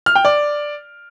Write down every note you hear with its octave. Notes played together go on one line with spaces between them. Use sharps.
F6
G5
D5